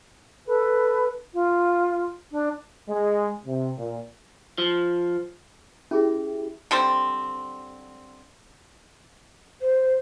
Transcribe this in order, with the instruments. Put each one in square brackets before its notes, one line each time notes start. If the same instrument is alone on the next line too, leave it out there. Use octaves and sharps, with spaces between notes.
[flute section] A4 B4
F4
D4
[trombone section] G#3
C3
A#2
[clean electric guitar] F3
[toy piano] C#4 G#4 E5 [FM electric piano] E4 G4
[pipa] D3 G3 C4 C5
[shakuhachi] C5